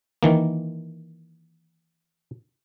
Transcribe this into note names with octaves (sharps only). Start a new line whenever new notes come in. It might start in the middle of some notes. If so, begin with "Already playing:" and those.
D#3 E3 A#3